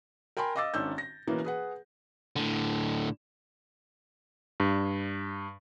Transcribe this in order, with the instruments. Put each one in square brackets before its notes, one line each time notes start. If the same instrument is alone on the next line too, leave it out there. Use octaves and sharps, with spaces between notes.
[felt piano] A#4 G5 G#5 B5 C6
D#5 F5 D6 E6 A6
G#1 D#3 C#4 D4 E6 G6
A#6
B2 E3 A#3 B3 C#4
G#4 B4 F#5
[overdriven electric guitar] A2 D3
[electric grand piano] G2